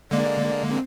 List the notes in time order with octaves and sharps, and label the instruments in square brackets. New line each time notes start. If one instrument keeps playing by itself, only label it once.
[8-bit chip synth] D3 G#3 A#3 [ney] D5
[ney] C4